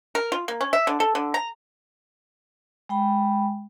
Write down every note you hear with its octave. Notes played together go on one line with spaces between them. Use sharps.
A#4
F4
A#3
C#4
E5
D3
A4
D3
A#5
G#3 G5 B5